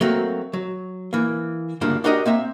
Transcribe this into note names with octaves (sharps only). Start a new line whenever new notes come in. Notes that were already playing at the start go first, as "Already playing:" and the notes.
F#3 A3 A#3 C4
F#3
E3 A#3
D2 G2 C#3 A#3 D4 F4
D4 F#4 G4 A#4 C#5 D#5
A#3 C4 E5 A#5